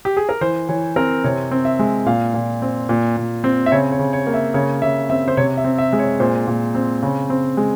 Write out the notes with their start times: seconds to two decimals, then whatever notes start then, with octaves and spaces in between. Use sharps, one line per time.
0.05 G4
0.17 G#4
0.29 A#4
0.41 E3 C5
0.69 E3 C#5
0.96 C4 A#4
1.24 C3 C#5
1.51 C4
1.65 E5
1.79 G#3
2.06 A#2 F5
2.34 A#2
2.62 C4
2.89 A#2
3.17 A#2
3.44 C4
3.66 E5
3.72 C#3 C#5
3.92 C#5
3.99 C#3
4.13 C#5
4.27 A#3
4.34 E5
4.54 C#3 C#5
4.82 C#3 E5
5.10 C4 E5
5.28 C5
5.37 C3 C#5
5.57 E5
5.64 C4
5.78 E5
5.93 G#3
5.99 C#5
6.20 A#2 C5
6.47 A#2
6.75 C4
7.02 C#3
7.30 C4
7.57 G#3